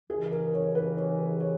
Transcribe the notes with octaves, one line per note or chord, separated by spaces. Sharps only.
D#2 C#3 E3 G#4
A#4
C#5
B4
C#5
C#5